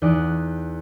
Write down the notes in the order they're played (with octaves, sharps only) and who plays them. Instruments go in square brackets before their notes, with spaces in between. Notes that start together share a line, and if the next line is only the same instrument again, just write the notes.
[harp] E2 D#4 D5 F#6